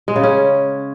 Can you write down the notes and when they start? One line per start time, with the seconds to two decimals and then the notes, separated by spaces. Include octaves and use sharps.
0.08 G#3
0.16 C#3
0.23 C#4